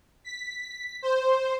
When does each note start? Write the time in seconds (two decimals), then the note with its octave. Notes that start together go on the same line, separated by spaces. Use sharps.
0.25 B6
1.02 C5